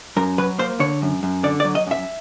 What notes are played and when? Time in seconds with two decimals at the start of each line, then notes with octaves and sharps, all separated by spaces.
0.17 F#2 A#4
0.38 F#3 B4
0.59 A#3 C5
0.79 D3 C#5
1.02 F#2
1.23 F#2
1.43 D3 D5
1.60 D5
1.65 F#3
1.75 D#5
1.86 F#2 E5